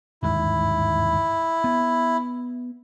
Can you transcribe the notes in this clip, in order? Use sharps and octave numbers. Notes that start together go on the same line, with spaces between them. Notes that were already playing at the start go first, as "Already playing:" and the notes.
G1 D#2 G#2 E4
B3